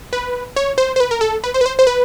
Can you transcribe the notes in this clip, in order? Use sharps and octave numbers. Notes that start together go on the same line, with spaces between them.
B4
C#5
C5
C5
B4
A#4
A4
B4
C5
B4
C5
C5
B4